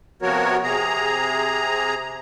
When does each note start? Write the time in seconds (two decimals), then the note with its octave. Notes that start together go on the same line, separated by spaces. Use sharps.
0.22 C3 F3 B3 F#4 A#4 C#5
0.63 C3 G#4 A#5